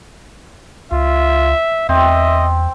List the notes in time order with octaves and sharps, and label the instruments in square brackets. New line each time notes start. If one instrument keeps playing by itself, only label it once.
[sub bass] C#2 [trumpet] F4 [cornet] E5
[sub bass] E2 [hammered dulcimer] C4 [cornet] D#5 [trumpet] E5